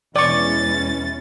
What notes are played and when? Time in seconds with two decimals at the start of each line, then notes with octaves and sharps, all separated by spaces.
0.16 E2 B2 E3 G#3 C#4 D5 C#6 A6